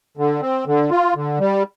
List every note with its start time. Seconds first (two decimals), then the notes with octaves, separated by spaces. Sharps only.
0.17 D3
0.41 C4
0.67 D3
0.91 F4
1.15 D3
1.40 G3